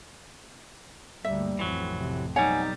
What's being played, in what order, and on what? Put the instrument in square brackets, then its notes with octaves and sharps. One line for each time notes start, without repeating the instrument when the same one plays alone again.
[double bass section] D2 G2 A#3 [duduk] G3 [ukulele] E5
[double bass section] A1 F2 C4 [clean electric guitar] E3 F#3
[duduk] C3
[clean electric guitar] B1 G3 [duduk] D#4 [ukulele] C#5 F#5 G#5